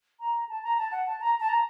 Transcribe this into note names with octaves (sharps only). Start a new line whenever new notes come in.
A#5
A5
A#5
A5
F#5
A5
A#5
A5
A#5